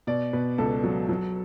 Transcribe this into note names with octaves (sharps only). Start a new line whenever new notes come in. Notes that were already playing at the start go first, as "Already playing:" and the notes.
B2 D5
B2 B4
C#2 A4
F#3
F#3